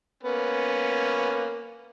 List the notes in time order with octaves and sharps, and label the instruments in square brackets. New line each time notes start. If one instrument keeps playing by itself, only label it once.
[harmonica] A#3 B3 C#4